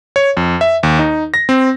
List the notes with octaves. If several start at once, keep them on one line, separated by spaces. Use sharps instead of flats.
C#5
F2
E5
D#2
D#4
A#6
C4